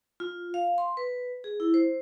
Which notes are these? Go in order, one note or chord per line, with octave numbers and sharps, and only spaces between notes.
F4
F5
C6
B4
G#4
E4
C5